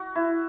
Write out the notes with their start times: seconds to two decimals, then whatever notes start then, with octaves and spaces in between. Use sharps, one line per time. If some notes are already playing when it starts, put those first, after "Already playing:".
Already playing: F#4
0.15 E4